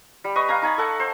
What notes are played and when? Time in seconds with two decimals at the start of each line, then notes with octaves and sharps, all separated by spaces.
0.24 G3
0.36 B4 D#5 C#6
0.48 F5 G#5 A#5
0.62 D#4 G#5 B5
0.78 A4 F#5 A5
1.00 C5